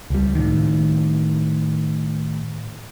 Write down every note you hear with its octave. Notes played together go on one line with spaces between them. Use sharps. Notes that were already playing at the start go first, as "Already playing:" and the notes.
C#2 G3
A2 D#3